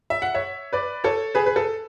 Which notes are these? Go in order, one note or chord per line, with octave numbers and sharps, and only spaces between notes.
E5
F#5
C#5 E5
B4 D5
A4 C#5
G#4 B4
B4
A4